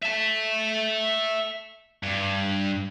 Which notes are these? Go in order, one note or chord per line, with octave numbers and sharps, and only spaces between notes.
E5 A5
G2